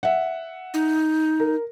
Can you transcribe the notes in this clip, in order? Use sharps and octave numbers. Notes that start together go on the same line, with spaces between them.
E5 F#5
D#4
A#4